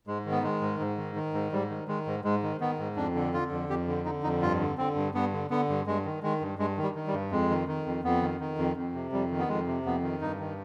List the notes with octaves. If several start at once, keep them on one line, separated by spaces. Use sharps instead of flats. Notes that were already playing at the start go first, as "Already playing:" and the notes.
G#2 G#3
D#3
B3
D#3 G#3
G#2
G#2
D#3
D#3
G#2
G#2 G3
D#3
D#3 G#3
G#2
G#2 G#3
D#3
D#3 B3
G#2
F2 D4
D3
D3 F4
F2
F2 G4
D3
D3 D#4
F2 D#4
G2 F4
D3
D3 C4
G2
G2 B3
D3
D3 B3
G2
G2 G#3
D#3
D#3 G#3
G2
G2 G#3
D#3
G3
D#3
G3
G2
F2 G#3
D#3
D#3
F2
F2 B3
D#3
D#3
F2
F2
C3
F2 G3
D#3
B3
F2 G#3
C3
F2 B3
D#3
G2 D#4
D#3